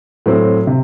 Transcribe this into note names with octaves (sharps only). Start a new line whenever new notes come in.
A2 F#3 A3 C4
C3